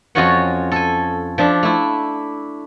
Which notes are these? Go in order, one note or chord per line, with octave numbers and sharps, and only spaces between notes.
F2 C#4 F4 F#4 C#5 F#5
A4 G#5
F3 D4 E5
A3 E4